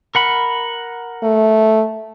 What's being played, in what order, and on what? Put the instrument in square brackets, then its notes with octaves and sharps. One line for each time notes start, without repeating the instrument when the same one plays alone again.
[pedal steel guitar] A#4 F#5 B5
[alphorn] A3